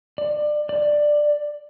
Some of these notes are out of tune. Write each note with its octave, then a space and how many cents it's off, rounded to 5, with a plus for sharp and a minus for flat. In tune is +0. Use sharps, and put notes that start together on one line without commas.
D5 +25
D5 +10